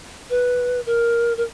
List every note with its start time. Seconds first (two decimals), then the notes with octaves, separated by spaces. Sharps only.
0.30 B4
0.86 A#4
1.37 A#4